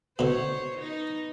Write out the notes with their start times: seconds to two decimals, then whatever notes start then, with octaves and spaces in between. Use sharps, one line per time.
0.19 B2 D3 C5 C#5
0.79 B3 D#4